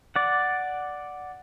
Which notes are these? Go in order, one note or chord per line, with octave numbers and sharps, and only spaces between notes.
D5 F#5